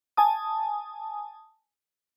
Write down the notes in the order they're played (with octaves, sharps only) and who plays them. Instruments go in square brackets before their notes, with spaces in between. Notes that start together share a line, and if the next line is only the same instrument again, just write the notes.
[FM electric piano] G#5 A5 D#6